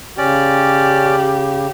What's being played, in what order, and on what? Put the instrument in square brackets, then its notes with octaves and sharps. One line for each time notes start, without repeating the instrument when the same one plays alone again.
[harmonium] C#3 [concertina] C#4 D5 [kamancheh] G4